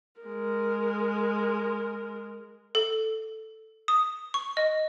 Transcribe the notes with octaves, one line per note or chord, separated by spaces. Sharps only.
G#3 A#4
A4
D#6
C#6
D#5